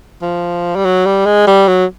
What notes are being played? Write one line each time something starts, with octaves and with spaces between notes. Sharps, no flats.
F3
G3
F#3
G3
G#3
G3
F#3